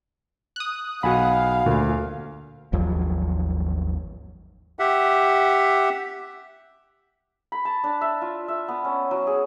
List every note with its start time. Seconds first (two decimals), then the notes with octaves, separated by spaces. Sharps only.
0.56 D#6 F#6
1.03 B1 F#4 F5 F#5 G#5 B5
1.66 D2 A#2
2.73 G#1 D#2 F3 F#3
4.79 G4 E5 F#5
7.52 B5
7.65 A5
7.84 D4
8.01 E5
8.22 F4
8.48 E5
8.68 B3
8.84 C#4
9.11 F#3
9.27 G#4